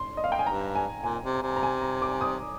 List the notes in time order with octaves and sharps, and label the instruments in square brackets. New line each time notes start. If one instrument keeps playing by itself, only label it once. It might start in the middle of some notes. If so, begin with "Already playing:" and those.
Already playing: [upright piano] C6
D#5
F5
G5
G#5
[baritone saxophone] G2 [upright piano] A#5
[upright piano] G#5
[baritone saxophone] A#2 [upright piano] G#5
[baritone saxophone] C3
C3
[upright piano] A#5
G#5
A#5
D6
D#6